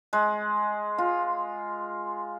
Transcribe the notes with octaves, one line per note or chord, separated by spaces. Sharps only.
G#3
F4